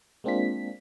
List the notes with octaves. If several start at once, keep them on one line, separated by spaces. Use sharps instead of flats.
G#3 A#3 C4 D4 F4 B6